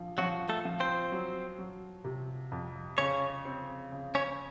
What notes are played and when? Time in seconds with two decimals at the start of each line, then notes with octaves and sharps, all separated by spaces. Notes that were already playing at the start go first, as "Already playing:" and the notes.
Already playing: A#1 F3
0.18 F3 F#3 F#4
0.49 A3 A4
0.65 F3
0.80 C4 C5
1.12 F#3
1.58 F#3
2.04 C3
2.52 F2
2.98 C#3 C#4 C#5
3.45 C4
3.92 C#3
4.15 C#4 C#5